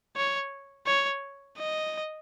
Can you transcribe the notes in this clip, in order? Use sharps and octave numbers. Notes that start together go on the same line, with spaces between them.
C#5
C#5
D#5